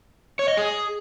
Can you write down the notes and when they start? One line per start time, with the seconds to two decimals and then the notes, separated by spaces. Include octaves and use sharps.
0.39 C#5
0.48 D#5
0.57 G#4